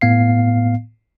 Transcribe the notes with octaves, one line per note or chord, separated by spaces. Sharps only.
A2 B3 F5 C7